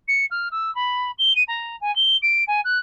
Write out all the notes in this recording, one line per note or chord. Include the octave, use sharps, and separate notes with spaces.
C#7
F6
E6
B5
G7
D#7
A#5
G#5
G7
D7
G#5
F#6